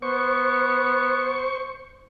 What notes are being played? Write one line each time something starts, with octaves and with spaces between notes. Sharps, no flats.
B3 C5 C#6